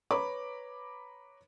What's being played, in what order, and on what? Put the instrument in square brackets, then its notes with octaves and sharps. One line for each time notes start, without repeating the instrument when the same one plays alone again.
[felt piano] B4 C#5 A#5 B5 D6